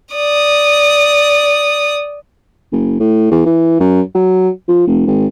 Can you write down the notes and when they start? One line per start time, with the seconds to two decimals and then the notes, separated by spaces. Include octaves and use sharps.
0.15 D5 D#6
2.72 F#1
3.00 A2
3.31 E2
3.46 E3
3.80 F#2
4.15 F#3
4.68 F3
4.87 F1
5.07 G#1